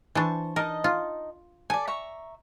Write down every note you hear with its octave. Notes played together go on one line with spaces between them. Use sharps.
E3 D4 C5 A5 C#6
D#4 A#4 D#5 A5
F4
A4 D5 G#5
E5 A#5 C#6